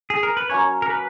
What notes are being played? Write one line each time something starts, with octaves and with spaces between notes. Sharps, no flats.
G#4
A#4
B4
F#3 A#3 C#4 C#5
A#4
B4